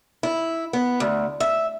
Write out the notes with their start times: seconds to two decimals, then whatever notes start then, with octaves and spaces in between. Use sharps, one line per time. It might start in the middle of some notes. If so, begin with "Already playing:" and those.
0.23 E4
0.73 B3
1.00 D2
1.40 E5